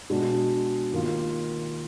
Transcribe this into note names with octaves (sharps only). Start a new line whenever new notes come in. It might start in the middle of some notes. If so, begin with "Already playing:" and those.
B2 G#3 D4 F#4
D#2 D#3 A#3 F4